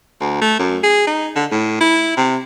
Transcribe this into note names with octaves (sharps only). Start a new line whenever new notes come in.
D2
A3
F#2
G#4
D#4
D3
A2
E4
C3